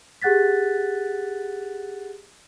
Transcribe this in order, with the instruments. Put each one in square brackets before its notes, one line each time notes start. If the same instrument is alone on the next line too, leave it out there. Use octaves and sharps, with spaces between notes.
[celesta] G4 G#4 F#5 F#6 A6 B6